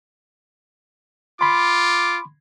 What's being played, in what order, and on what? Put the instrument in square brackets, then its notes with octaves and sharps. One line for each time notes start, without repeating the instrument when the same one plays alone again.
[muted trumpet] F4 [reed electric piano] B5 C6 [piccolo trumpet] D6